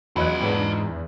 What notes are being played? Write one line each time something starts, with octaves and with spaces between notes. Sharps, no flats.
E2 F#3 F4 D#5 B5 F#6
G#2 B3 D4